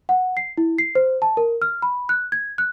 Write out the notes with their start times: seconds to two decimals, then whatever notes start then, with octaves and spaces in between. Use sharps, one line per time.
0.09 F#5
0.37 C7
0.58 E4
0.78 C7
0.95 C5
1.22 A5
1.37 A#4
1.62 F6
1.82 B5
2.09 F#6
2.32 G#6
2.58 F#6